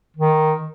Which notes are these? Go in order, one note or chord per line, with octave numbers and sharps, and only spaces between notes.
D#3